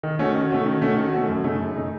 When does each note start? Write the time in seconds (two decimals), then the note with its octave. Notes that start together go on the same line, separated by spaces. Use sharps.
0.03 D#3
0.19 A3 C#4 F#4
0.35 D#3
0.50 A3 C#4 F#4
0.66 D#3
0.82 A3 C#4 F#4
0.98 D#3
1.13 A3 C#4 F#4
1.29 F#2
1.44 C#3 A3 D#4
1.60 F#2
1.76 C#3 A3 D#4